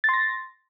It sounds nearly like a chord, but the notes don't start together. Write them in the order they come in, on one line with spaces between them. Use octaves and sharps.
A6 C6 A#6